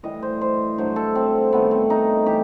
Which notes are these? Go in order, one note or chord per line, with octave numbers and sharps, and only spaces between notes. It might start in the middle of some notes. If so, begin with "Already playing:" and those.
A2 E3 G3 D#5
C5
C5
G2 F#3 A3 C5
A4
C4
G2 D#3 A3 B3
C4
D#4
E3 G3 G4